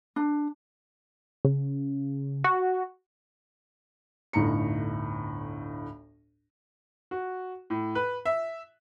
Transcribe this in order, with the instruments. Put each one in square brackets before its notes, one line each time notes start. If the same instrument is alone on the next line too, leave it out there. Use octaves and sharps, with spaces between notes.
[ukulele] D4
[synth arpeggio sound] C#3
F#4
[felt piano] G1 D2 A2 D#4 A#5 C#7
[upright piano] F#4
A2
B4
E5